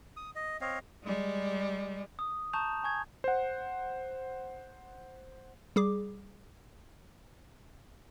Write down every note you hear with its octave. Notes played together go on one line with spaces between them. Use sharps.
D#6
D#5
C4 C#5 D#5 F5
G3 G#3
D#6
A5 A#5 C#6 D#6 G6 F7
G#5 C#6 G#6
C5 F#5
G3 G#4 D6